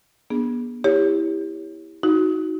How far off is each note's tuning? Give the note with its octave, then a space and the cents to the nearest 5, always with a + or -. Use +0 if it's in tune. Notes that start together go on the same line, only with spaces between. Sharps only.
B3 -35 D4 +0 G#4 +0
E4 -10 G4 +20 C#5 +0
D#4 +25 F#4 +0